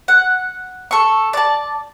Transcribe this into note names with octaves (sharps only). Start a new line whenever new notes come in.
F#5
A4 C#6
D5 A5